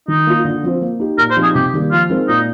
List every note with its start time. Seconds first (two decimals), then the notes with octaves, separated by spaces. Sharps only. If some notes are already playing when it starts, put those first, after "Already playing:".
0.08 D#3 D#4
0.27 A#3 F4
0.45 D3
0.63 F3 C4 F4 C5
0.82 A#3
1.00 D#4 G4
1.18 A#2 A#4
1.31 C5
1.37 F3 C4 D#4 G4
1.43 G#4
1.55 C3 G4
1.73 D#3 G3 A#3
1.92 F3 F4
2.10 G#3 C4 D#4 A#4
2.28 A#2 D#4